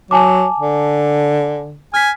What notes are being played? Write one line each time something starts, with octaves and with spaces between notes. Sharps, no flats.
F#3 G#5 A5 D6
D3
G#5 F6 B6